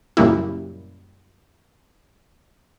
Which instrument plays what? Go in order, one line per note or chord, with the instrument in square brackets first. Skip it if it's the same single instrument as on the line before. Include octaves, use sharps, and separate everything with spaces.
[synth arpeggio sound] F#2 A#2 C#3 G3 A#3 E4